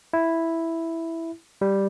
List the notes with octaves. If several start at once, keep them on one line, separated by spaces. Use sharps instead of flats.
E4
G3